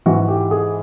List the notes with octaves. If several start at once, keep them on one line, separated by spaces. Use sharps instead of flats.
G#2 E3 F#4
G4
G#4